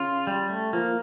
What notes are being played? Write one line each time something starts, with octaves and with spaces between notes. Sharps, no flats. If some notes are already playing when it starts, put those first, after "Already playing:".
Already playing: C#3 F4
G3
A3
F3 A#3